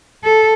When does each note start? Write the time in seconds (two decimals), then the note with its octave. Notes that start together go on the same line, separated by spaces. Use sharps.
0.24 A4